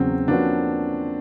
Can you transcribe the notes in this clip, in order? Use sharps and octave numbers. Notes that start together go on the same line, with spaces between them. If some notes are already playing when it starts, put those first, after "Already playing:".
Already playing: E2 C#3 F#3 C4
F3 A#3 C#4 D4 F#4 B4